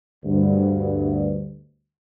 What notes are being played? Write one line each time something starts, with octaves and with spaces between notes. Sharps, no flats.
D2 G2